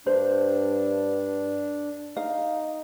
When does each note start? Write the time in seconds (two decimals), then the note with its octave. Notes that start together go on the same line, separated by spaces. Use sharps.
0.07 G2 D4 C5
2.17 D#4 F5